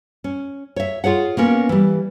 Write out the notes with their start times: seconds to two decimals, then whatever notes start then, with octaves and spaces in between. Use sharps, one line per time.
0.24 C#4
0.76 C#5 E5
1.04 F4 G#4 C#5 F#5
1.37 A#3 B3 C#4 A#4
1.69 E3 G3